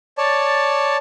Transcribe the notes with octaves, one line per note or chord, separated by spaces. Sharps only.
C#5 D5 A5